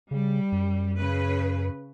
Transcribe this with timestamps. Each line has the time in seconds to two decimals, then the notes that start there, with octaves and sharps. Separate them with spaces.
0.11 C#3 G3
0.52 F#2
0.99 C#3 B4